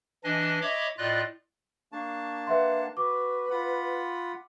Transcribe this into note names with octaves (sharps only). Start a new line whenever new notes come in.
E3 D4 D#5 G#5
C#5 D#5 E5 B5 D6
A2 F4 D5 D#5 F#6
A#3 D4 A5 C#6
B4 E5 F#5 C6
F#4 B4 D6
F4 F#5 B5